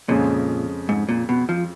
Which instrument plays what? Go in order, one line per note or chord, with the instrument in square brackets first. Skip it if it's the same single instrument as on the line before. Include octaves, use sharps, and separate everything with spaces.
[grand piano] F2 C#3 G#3 C#4 F4 [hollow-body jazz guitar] A#2
[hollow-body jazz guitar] G#2
A#2
B2
F3